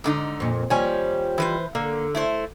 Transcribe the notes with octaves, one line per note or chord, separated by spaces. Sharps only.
G#2 D3 D#4
F2 A#2
D#2 F3 G3 C#5 G#5
E3 B4 C5
D3 A#3
A3 E4 C5